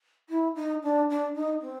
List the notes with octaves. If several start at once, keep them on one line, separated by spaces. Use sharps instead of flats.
E4
D#4
D4
D4
D#4
C4